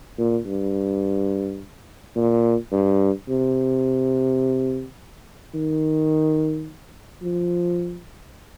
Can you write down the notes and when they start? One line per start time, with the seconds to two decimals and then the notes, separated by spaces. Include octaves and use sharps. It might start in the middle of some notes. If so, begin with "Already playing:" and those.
0.19 A#2
0.46 G2
2.16 A#2
2.71 G2
3.29 C3
5.54 D#3
7.22 F3